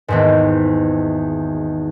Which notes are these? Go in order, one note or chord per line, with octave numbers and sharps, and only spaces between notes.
G#1 E2 G#2